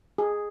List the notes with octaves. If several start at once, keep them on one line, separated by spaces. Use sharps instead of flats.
G#4